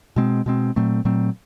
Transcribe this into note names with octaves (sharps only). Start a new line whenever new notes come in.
B2 G#3 C4
B2 G#3 C4
A#2 F#3 A3 C4
A#2 F#3 A3 C4